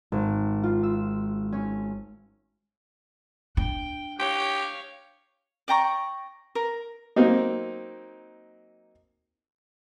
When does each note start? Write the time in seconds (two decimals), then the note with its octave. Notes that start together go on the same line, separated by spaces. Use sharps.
0.12 G#1
0.63 F4
0.83 E6
1.52 C#4
3.57 D4 G5
4.20 G4 C#5 F5
5.68 D5 G5 A#5 C#6
6.55 A#4
7.16 F#3 A#3 C4 D#4